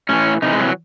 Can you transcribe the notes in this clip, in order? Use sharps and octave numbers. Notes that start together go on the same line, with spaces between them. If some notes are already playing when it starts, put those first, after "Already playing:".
A2 E3 C#4
C3 E3 D#4
G#3
F#3